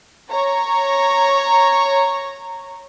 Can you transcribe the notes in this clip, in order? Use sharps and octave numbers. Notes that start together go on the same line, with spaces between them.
C#5 A#5